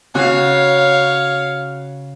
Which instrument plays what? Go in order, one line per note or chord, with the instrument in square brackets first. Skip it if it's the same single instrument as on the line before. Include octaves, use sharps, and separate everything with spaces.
[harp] C#3 F#4 [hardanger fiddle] C#5 F5